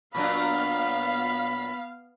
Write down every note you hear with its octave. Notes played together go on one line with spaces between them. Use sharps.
A#2 F#3 B3 D4 F5 B5